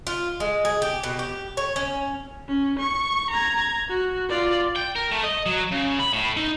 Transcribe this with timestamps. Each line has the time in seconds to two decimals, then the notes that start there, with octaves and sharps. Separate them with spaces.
0.07 F4
0.40 G#3
0.65 G#4
0.82 G4
1.03 B2
1.19 G4
1.57 C#5
1.76 C#4
2.49 C#4
2.79 C#6
3.31 A#5 G#6
3.89 F#4
4.29 F4 D5
4.76 G5
4.96 A#4
5.12 A3
5.24 D#5
5.46 F#3
5.71 C#3
5.99 B5
6.13 A2
6.36 D#4